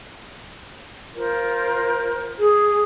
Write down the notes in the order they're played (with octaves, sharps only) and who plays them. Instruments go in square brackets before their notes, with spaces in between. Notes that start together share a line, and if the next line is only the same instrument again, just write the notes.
[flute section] F4 A#4 C5
[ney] G#4